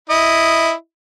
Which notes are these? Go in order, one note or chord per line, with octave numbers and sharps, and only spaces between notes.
E4 D#5